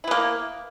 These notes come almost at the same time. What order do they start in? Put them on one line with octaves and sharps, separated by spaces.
E4 B3 A#3